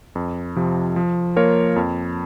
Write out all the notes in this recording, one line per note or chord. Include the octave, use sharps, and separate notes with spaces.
F2
C3 F3
F3
A#3 F4 A#4 C#5
F2